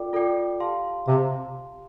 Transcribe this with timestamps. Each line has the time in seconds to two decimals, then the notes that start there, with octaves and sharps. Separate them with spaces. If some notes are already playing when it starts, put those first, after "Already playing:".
Already playing: F4 A4 D5 G5 D6
0.13 F4 A4 D5 G5 D6
0.60 G4 F5 A5 C6
1.08 C3 G4 F5 A5 C6